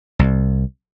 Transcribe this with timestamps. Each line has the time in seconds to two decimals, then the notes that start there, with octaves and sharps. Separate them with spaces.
0.19 C2